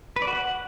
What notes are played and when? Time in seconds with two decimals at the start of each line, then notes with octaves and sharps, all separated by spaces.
0.16 B4
0.22 D5
0.27 F#4
0.33 F#5